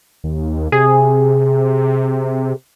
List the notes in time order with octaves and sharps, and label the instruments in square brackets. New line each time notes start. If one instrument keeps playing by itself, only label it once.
[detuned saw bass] D#2
[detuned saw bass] C3 [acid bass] G#4